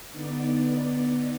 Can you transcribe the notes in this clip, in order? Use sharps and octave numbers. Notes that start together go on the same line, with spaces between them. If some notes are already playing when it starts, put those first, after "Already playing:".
D3 B3 D#4 D5